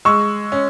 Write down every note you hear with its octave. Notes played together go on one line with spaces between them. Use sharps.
G#3 C#6 E6
C#4